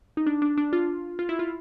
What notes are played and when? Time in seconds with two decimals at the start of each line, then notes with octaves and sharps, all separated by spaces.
0.17 D#4
0.26 D4
0.42 D4
0.58 D4
0.73 F4
1.19 F4
1.29 E4
1.39 F4